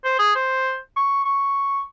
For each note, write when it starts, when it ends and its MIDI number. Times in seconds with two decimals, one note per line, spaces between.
0.04 0.18 72
0.19 0.34 68
0.36 0.77 72
0.96 1.23 85
1.25 1.82 85